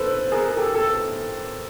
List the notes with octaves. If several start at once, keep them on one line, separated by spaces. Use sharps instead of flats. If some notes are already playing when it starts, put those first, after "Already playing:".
Already playing: A4 B4 C5
G#4 A#4
G4 A4
A4